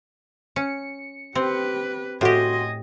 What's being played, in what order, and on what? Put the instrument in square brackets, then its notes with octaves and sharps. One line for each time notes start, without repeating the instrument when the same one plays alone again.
[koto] C#4 [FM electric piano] C#7
[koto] C4 [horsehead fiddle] G4 B4
[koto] A2 G4 [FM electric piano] F#4 C6 [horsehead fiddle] D#5 G#5